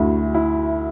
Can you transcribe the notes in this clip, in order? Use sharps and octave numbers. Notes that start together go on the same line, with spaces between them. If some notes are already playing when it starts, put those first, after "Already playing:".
Already playing: D2 E4 F#4
E4